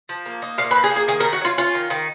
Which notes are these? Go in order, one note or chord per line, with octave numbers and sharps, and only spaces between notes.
F3
A#3
D#4
A#2 F5
B4
F3
G#4
A#3
G#4
D#3 G#4
A#4
D#3
F#4
F#3 F4
C#4 F4
D#3
D#3